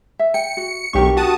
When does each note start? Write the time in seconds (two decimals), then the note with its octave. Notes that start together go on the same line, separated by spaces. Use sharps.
0.19 E5
0.34 G5 C#7
0.57 F#4
0.93 B1 D4 G4 A#4 C#6
1.17 F#4 A5 D#6